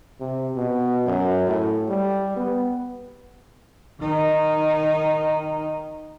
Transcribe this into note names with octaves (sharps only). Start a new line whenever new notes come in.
C3
B2
F#2
A2
G3
B3
D#3 D#4